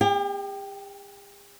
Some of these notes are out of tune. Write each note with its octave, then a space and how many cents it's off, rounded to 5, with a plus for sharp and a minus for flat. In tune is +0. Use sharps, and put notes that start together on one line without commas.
G4 +45 G5 +0